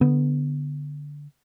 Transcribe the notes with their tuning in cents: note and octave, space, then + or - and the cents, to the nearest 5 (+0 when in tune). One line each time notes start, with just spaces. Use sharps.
D3 -10 B3 +0